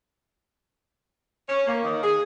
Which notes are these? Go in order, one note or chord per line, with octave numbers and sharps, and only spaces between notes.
C#4
A#3
D#3
G#4